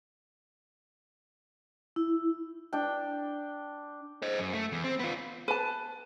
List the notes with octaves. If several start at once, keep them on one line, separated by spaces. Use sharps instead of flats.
E4
D4 G5
C5 D#5
F#2
A3
E2
C4
B3 F4
B4 A5